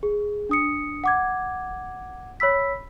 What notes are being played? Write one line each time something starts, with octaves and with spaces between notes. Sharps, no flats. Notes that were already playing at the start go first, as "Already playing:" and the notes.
G#4
D4 D#6 C#7
F#5 D6 G#6
C#5 B5 E6 B6